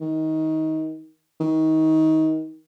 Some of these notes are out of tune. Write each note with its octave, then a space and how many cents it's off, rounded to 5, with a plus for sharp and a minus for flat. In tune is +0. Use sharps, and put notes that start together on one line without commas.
D#3 +20
D#3 +25